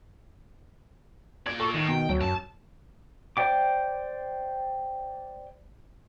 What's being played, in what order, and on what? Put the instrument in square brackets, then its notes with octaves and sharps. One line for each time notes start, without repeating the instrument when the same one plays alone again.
[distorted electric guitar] A#2 D5 [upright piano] G#6
[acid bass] A4 [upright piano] C#6
[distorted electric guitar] A2 [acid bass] D#3
[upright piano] B2 [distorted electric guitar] G5
[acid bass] D2 [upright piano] F#3
[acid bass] F#2 [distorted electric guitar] A5
[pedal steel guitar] C5 D5 G5 D6